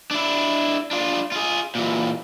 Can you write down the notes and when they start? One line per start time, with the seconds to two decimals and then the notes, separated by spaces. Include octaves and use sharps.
0.11 D4 E4
0.91 D4 F4
1.32 F4 G#4
1.75 A#2 E3